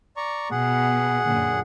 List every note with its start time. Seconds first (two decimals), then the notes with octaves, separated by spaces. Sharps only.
0.17 D5 A#5 C#6
0.51 B2 G#4 F#5
1.25 F#2 A#2 D3